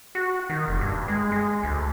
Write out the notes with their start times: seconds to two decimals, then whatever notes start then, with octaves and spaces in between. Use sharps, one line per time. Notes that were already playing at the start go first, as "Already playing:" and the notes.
0.15 F#4
0.50 D#3
0.68 F1
0.81 G2
1.08 G#3
1.32 G#3
1.63 D2